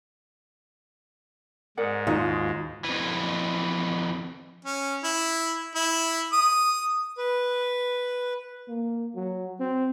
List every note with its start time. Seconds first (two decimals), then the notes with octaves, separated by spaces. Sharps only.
1.77 G#2 A#4 D5 F#5
2.07 D#2 D#4 F4 F#4 D#5
2.85 F2 E3
4.65 C#4
5.04 E4
5.75 E4
6.33 D#6
7.18 B4
8.68 A#3
9.15 F#3
9.60 C4